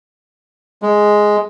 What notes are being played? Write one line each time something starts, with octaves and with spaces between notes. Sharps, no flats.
G#3